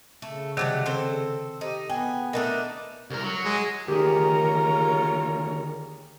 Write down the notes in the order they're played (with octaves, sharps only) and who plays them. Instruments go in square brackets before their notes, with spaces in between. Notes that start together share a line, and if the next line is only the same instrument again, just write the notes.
[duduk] C#3 [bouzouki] A3
[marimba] C3 D#3 [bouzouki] F#3 G3 A3
[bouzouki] C4 A4 C5
[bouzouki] D#4 [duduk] G4
[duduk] B3 [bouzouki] G#4 [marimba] G5
[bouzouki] A3 D4 D#4 [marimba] A#4
[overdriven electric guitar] C2 A#4
F#3
[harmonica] G#3
[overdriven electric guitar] D2 D#3 [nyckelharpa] F4 A#5 [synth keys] G4 G#4 [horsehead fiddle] A#4 C#5